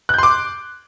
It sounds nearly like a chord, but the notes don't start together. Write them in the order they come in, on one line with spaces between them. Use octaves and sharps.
F#6 G6 C6 D6